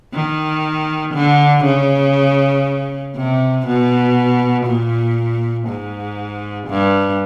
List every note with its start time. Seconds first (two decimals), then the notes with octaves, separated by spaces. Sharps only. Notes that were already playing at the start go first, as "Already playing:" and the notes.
0.14 D#3
1.15 D3
1.65 C#3
3.16 C3
3.67 B2
4.66 A#2
5.68 G#2
6.68 G2